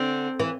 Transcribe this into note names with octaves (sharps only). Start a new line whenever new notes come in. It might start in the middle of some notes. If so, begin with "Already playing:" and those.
Already playing: D3 C4
E3